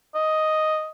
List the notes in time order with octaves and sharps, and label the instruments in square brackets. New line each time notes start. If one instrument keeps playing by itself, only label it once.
[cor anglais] D#5